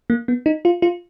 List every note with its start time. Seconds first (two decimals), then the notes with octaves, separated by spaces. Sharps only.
0.10 A#3
0.28 B3
0.46 D#4
0.65 F4
0.82 F4